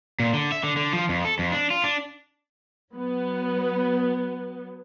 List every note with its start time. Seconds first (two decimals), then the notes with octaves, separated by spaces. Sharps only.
0.20 A#2
0.34 D3
0.52 E5
0.64 D3
0.77 D3
0.93 F3
1.09 F2
1.25 A4
1.39 F2
1.52 D4
1.70 F4
1.84 D4
2.93 F#3 B3